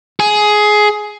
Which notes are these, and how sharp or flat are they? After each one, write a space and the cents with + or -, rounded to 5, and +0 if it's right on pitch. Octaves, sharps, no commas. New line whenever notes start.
G#4 +15